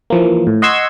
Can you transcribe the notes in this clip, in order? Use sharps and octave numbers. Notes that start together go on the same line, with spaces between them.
E3 F3 A#3
A2
D#5 F#5 C6 C#6 E6 G#6